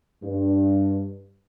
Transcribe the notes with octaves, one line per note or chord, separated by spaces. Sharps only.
G2